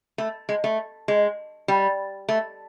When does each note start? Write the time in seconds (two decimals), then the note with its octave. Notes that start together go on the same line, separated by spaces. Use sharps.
0.18 A3
0.49 G#3
0.64 A3
1.08 G#3
1.68 G3
2.29 A3